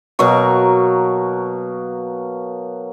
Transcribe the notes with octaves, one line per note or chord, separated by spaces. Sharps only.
B2 F#3 A#3 C#6